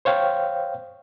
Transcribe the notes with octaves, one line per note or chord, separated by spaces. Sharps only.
C5 C#5 F5 G5